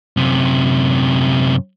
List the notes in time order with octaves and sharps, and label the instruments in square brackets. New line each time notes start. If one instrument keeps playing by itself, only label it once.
[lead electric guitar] F#2 C3